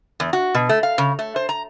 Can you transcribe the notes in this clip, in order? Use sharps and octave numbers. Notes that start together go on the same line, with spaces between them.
E2
F#4
B2
A3
F5
C#3
A3
C5
A#5